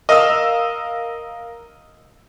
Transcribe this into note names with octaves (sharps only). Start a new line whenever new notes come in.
A#4 D#5 F5 E6